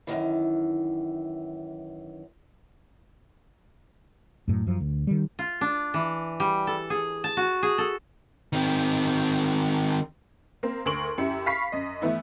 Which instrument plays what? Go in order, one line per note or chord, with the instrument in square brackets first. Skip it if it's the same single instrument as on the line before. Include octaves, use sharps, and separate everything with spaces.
[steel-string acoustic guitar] F#2 A#2 D#3 E3
[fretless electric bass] F#2 A2
F#2 F3
D2
D#3 G3
[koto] F4
D4
E3
G3
A4
G#4
A5
F#4
G#4
A4
[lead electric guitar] D#3 C4
[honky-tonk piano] A#3 C4
D2 A#4 C6 C#6 D7 F#7
F#2 E4 G4 C#7
F5 B5 C#6 B6 C7
F#2 D#5
E3 A3 B3 E4